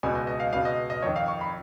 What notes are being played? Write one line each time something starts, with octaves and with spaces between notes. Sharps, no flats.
C#2 B2 G#5
D#5
D#5
F5
C#2 B2 F5
D#5
D#5
F2 D#3 C#5
F5
C#6
B5